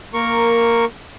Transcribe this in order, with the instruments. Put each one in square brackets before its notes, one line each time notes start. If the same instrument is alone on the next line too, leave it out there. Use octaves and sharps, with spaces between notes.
[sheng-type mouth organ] A#3 A#4 C#6